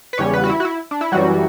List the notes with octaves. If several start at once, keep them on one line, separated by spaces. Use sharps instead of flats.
B4
E2 C#3 G3 C#4 C#5
B3 B4
F#4
E4
F#4
E4
D4
E4
F#2 E3 F#3 G3 F#4